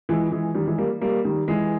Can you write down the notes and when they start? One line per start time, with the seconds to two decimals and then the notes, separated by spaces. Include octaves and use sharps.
0.09 E3 G#3
0.31 E3 G#3
0.54 D#3 G3
0.66 E3 G#3
0.78 G3 A#3
1.01 G3 A#3
1.25 D#3 G3
1.48 E3 G#3